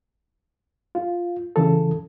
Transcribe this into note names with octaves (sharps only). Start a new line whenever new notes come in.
F4
C#3 E3 A4